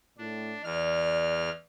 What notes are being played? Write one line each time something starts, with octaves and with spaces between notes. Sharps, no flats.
A2 D4
E2 D5 F6